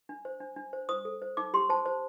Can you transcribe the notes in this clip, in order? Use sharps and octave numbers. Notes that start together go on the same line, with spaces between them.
D4
C5
D4
D4
C5
C5 D#6
A4
C5
D#4 D6
G4 C6
C5 A5
C5